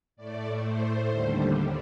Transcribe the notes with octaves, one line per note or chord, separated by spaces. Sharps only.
A2 A3 D5
C5
D#2 D3 G3